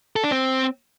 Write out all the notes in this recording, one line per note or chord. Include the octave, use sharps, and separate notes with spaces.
A4
D4
C4